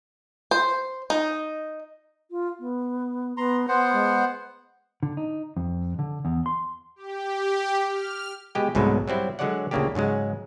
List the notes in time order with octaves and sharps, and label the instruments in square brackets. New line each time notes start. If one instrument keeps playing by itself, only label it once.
[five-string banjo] C5
D#4
[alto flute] F4
B3
[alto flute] B3 [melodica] A#5 C6
[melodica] B3 C5 F#5 [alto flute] C6
[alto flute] G#3
[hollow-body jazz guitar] D3
D#4
F2
D3
E2
C6
[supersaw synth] G4
F6
[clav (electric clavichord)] B2 G#3 G4 G5
C2 G#2 B2 F#3 G#3 A3
F#3 G3 C4 E4
D3 F#3 G#3 C#5 D5 F#5
D2 A#2 C#3 A#3 D4 G4
G#2 C#3 F#3 G#3